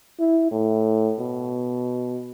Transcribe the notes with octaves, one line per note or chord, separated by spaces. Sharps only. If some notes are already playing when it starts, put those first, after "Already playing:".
E4
A2
B2